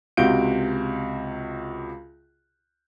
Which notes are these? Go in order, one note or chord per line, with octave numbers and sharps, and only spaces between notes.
C#2 C3 F#4 F5 G6 D7